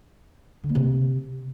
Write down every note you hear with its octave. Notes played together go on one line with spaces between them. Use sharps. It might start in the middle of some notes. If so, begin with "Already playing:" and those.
D3
A#3
C3